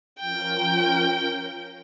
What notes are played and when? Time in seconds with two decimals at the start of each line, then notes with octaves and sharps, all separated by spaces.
0.20 F3 C#4 F4 A#4 G5